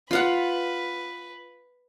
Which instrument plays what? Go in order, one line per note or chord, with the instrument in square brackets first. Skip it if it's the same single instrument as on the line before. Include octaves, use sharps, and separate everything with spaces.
[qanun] F4 F5 F#5 [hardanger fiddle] B4